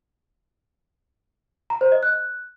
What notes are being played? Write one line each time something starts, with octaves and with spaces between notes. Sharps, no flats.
A#5
C5
D#5
F#6